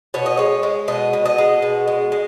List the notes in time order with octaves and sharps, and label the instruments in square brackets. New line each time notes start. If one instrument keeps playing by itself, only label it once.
[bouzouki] B2 C#5
D#5
G#3 C#5
G#3
B2 D#5
B2
D#5
G#3
B2
G#3
G#3